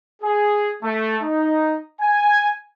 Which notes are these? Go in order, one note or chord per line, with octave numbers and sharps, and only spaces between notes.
G#4
A3
D#4
G#5